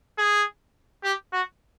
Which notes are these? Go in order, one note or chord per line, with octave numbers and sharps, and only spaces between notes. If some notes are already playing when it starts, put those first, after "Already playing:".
G#4
G4
F#4